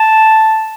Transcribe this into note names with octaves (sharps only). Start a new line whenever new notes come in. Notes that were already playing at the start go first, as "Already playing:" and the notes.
Already playing: A5